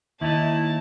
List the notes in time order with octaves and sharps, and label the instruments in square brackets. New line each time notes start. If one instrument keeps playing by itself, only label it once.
[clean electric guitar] D#2 D#4 [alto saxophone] E4 [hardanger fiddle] A5